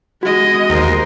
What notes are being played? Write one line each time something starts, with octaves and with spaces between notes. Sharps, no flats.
G#3 F#4 D#5
D#2 A#4 C5